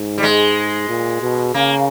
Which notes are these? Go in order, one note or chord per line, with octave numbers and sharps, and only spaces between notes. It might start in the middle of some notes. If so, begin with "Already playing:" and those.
Already playing: G#2
G3
G#3
A#2
B2
C#3 A#3